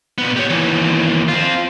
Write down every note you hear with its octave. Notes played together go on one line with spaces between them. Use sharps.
A#2 B3
G4 C#5
D#2 E3
C4 F4